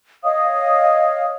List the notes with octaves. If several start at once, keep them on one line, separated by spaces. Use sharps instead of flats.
C#5 D#5 F5 D#6